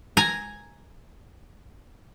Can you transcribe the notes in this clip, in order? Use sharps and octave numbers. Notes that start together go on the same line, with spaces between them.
G#5 A#5